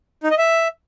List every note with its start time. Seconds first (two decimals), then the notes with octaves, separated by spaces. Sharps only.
0.23 D#4
0.31 D#5
0.38 E5